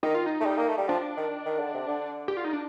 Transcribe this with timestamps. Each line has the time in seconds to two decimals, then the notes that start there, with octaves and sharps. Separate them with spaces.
0.03 D#3 D#4
0.15 F4
0.26 D#4
0.40 A3
0.46 G3
0.58 A#3
0.68 A3
0.78 G3
0.88 F3 D4
1.17 D#3
1.46 D#3
1.60 D3
1.74 C3
1.88 D3
2.28 G4
2.37 F4
2.45 D#4
2.53 D4